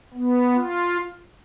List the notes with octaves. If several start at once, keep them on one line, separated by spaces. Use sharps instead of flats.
B3
F4